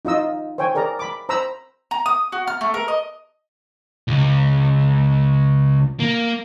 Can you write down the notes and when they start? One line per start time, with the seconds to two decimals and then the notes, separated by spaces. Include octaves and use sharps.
0.05 D#4 F4 D#5 E6
0.58 C5 C#5 G5 G#5
0.75 G#4 A#4 D5 A#5
0.99 B5 D6
1.29 C5 A#5 B5 E6
1.91 A#5
2.06 D#6
2.32 F#4
2.47 F6
2.61 A3
2.74 A#4
2.88 D#5
4.08 C#2
6.00 A#3